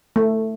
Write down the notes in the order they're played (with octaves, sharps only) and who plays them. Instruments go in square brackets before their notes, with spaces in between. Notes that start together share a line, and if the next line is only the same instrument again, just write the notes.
[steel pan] A3